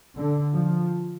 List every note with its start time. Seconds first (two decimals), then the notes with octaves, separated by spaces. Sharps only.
0.17 D3
0.54 F3